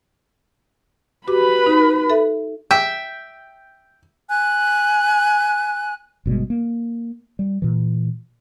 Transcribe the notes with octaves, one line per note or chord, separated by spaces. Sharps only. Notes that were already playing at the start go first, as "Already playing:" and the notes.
F#4 G4 B4 B5 D6
D#4
A4 E5
E5 G5
G#5 F#6
G1 B2 G3 G#3
A#3
G3
A#2 E3